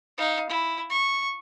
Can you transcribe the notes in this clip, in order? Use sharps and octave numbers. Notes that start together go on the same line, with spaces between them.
D#4 F5
E4
C#6